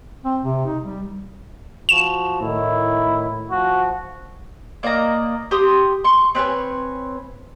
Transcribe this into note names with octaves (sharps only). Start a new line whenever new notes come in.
C4
C3
D#4
G3
F3 F#4 E7
A2 D#3 E4
F3 F#4
A#3 D5 D#5 A#5
G4 C6 D#6
C6 C#6
C4 B4 C#5 G#5